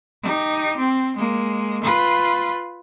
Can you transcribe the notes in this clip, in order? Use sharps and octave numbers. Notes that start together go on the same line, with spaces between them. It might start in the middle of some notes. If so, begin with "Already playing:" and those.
D#4 G4
C4
G#3 A#3
F4 B4